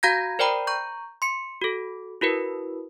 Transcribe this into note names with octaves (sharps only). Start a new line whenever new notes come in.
F#4 F5 A#5 G6 G#6 A#6
A#4 C5 D5 G5 A#5 B5
A#5 C#6 G6
C6 C#7
F#4 A4
E4 F#4 A#4 B4